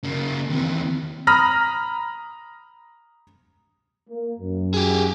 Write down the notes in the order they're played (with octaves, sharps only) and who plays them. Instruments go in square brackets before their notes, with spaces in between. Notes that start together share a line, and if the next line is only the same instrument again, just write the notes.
[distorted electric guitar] C#3 A#3
[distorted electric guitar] D#2 E3 [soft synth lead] C4
[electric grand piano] A#5 B5 D#6 F6 A#6
[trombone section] A#3
F#2
[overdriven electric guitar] G4 G#4